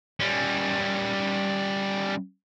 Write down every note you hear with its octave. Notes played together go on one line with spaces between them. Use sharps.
G3 C#4